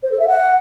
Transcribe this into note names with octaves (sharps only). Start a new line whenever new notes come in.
C5
A4
E5
F#5